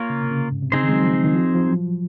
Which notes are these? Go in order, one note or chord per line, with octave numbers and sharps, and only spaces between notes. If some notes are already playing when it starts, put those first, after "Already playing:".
Already playing: A#3 F4 A#4 C#5
C#3
C3
C#3
G#2
C3
C#3 C4 D#4 G#4 C5
D#3
G#3
F#3
F3
D#3
F3
F3
F#3